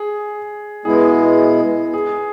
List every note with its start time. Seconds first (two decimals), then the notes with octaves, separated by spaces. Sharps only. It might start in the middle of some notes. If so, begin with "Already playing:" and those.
Already playing: G#4
0.85 B2 G#3 B3 E4 G#4
1.94 G#4